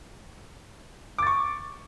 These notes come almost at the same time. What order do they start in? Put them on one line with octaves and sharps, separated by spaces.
D6 A6 C#6